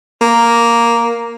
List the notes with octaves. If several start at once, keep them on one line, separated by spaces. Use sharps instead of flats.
A#3